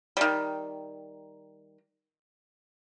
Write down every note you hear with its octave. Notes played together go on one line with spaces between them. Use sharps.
D#3 G3